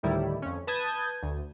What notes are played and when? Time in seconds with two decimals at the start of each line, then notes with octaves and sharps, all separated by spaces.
0.03 D2 A2 D#3 G3 E4
0.42 F2 C#4
0.67 B4 A5 D#6 G6 G#6
1.23 D2